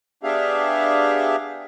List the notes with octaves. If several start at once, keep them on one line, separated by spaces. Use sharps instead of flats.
B3 D4 G4 G#4 E5 F5